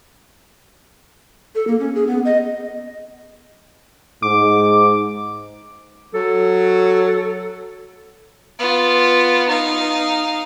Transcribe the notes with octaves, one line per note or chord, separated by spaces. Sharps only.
A4
A#3
C#4
G#4
B3
D#5
G#2 D6
F#3 A4
B3 F4
D#4 F5